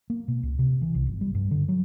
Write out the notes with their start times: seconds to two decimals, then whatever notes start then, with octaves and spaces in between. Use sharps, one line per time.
0.10 A#3
0.28 B2
0.43 C#2
0.59 C3
0.82 E3
0.95 C2
1.06 G1
1.21 G3
1.34 G2
1.51 D3
1.68 F#3